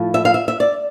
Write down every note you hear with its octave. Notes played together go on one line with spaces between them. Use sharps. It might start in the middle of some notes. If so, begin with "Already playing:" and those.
Already playing: A2 F3
E5
F5
E5
E5
D5